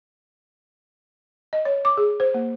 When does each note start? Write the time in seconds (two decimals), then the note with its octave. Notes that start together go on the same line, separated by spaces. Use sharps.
1.53 D#5
1.65 C#5
1.85 D6
1.97 G#4
2.20 C5
2.34 A#3